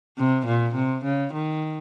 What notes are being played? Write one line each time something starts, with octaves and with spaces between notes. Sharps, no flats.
C3
A#2
C3
C#3
D#3